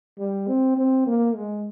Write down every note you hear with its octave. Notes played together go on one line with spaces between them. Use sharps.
G3
C4
C4
A#3
G#3